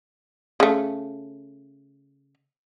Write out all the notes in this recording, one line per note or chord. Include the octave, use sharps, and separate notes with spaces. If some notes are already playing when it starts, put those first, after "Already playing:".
C#3 A3